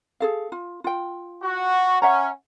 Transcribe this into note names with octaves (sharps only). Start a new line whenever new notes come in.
G#4 A4 F5
F4
F4 G5
F#4
C#4 E5 F#5 A#5